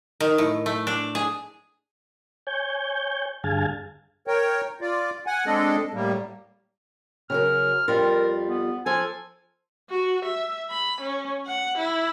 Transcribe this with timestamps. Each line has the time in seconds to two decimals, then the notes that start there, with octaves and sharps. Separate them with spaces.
0.20 D#3
0.38 A2
0.66 A3
0.87 D4
1.15 G#4
2.47 C#5 G#5 G6
3.44 G2 D3 G#4 F5 G#5 A5
4.27 A#4 C#5 G5
4.81 F4 D5
5.27 F#5 G#5
5.47 G#3 C4 D4 A4 D#5
5.94 A2 G3 A#3
7.30 C#3 F#3 A#4 F6
7.88 F2 G3 F4 A#4
8.47 B3
8.86 F3 A4 G#5
9.90 F#4
10.26 E5
10.70 B5
11.01 C#4
11.47 F#5
11.78 E4